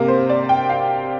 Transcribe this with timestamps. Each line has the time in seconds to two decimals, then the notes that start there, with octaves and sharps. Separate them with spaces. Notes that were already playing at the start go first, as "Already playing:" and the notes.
Already playing: C3 A#3 A#4
0.08 C5
0.29 D5
0.49 G5
0.70 F5